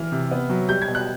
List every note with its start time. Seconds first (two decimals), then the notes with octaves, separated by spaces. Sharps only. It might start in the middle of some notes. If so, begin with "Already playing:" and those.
Already playing: E3 F6
0.12 C3
0.31 B3
0.50 F#3
0.68 G3 G6
0.82 G#6
0.88 B2
0.95 F#6